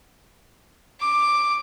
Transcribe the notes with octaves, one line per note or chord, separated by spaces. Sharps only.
D6